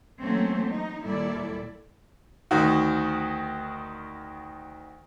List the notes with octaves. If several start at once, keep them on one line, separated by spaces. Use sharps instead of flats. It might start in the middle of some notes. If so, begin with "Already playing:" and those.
E3 F#3 A3 A#3 C4 C#4
D#4
D#2 A#2 G3 E4 A4 D5
D2 D#3 F#4